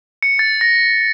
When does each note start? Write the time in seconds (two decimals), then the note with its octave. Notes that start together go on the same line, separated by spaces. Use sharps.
0.23 C#7
0.39 A6
0.61 A#6